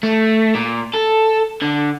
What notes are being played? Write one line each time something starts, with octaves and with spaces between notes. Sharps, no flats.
A3
A#2
A4
D3